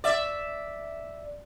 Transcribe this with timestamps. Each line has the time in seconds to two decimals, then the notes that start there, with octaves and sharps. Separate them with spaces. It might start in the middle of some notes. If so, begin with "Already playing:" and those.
0.04 D5 E5